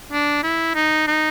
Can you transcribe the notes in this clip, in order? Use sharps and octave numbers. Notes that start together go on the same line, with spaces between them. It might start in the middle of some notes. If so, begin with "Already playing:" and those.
D4
E4
D#4
D#4